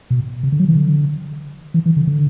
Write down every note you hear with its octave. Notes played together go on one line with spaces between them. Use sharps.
B2
C3
D3
F#3
E3
D3
E3
E3
D3
D3